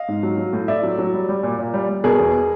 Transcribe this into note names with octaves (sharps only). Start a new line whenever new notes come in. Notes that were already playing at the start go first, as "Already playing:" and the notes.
Already playing: D#5 F5
G#2
F#3
F#3
A2
A2 D5 E5
F#3
F#3
G3
G3
A#2
A#2
G3
G3
B2 G#4 A#4
E2